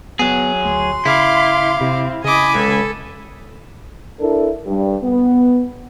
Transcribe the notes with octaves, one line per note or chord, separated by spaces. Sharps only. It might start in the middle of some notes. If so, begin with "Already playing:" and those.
F#3 B3 G#4
D2 C6
C#3 E4 F5 D6
C3 C4
C#3 D#5 G#5 B5 D6
C#2 A4
D4 E4 A4 A#4
G2 G3
B3